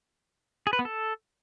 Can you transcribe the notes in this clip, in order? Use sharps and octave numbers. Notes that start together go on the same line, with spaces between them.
G#4
B4
B3
A4